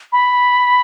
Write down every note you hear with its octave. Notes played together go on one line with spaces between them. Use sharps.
B5